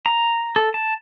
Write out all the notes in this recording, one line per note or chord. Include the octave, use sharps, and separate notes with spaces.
A#5
A4
A5